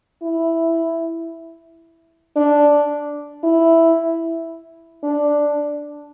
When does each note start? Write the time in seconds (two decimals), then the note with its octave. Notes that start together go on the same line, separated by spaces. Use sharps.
0.22 E4
2.36 D4
3.43 E4
5.04 D4